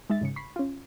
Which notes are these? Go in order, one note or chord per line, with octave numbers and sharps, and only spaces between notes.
G#3 D#4 E5 A6
G#2 C#3 C#7
B5 C#6 B6 C7
C#4 F4